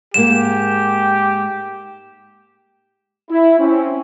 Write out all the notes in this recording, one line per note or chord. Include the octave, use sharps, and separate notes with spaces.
G#2 G#3 A#3 G4 E7
E4
C4 C#4